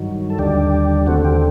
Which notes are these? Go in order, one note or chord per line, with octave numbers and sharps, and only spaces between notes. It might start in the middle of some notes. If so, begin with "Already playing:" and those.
Already playing: G2 D#3 F#3
A4
D#2 D3 G3 D4 G4
D#2 D3 A3 C4 F#4
G4